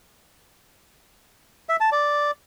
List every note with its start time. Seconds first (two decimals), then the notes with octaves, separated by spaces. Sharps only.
1.69 E5
1.81 A5
1.92 D5